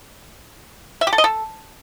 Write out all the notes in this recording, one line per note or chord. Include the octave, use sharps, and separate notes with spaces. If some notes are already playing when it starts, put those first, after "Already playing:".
E5
G4
A4
D#5
A4